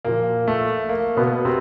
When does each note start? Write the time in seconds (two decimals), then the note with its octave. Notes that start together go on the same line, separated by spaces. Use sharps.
0.05 A#2 F3 A#3
0.47 A3
0.89 A#3
1.17 B2 B3
1.45 C3 C4